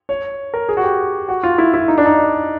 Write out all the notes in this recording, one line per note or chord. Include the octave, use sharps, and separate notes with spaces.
C#5
A#4
G#4
F#4
G4
F#4
F4
E4
E4
D#4
D4
D#4